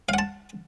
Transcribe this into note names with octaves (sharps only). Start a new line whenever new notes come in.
F5 F#5 A5